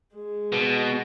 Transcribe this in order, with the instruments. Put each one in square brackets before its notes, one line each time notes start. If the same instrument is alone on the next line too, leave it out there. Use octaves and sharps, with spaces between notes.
[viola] G#3
[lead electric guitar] B2